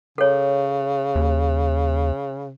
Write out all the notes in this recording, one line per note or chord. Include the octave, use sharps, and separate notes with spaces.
C#3 A4 C#5
D#2